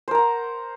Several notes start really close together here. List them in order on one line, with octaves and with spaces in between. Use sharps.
C5 A#4 A#5 F#5